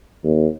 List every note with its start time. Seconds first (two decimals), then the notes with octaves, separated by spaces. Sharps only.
0.24 D#2